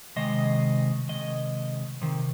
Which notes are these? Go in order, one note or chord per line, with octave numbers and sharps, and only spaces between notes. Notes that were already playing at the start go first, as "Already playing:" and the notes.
C3 D#3 G#3 D#5
C3 D#3 G#3 D#5
C3 D#3